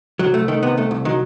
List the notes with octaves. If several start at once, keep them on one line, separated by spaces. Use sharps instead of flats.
C2 F#3
C2 A3
D#3 A3
C3 B3
C2 A3
C2
D#3 F#3